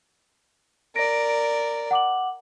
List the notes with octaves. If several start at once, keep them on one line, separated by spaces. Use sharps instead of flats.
A#4 D5 A#6 D7
F#5 D6 F#7